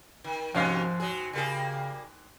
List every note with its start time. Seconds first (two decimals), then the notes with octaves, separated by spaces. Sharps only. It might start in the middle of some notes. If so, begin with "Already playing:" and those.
0.24 D#3
0.55 D#2 G#2 C3 F3 F#3 C#4 F5
1.00 F#3 G#4
1.33 C#3 G3 A#3 G#4